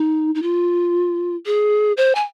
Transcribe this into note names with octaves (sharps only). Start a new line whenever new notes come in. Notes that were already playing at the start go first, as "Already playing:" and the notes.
Already playing: D#4
D#4
F4
G#4
C5
G#5